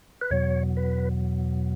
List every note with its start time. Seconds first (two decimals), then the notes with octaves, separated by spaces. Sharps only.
0.21 B4
0.31 E2 B2 F#3 C#5
0.77 B4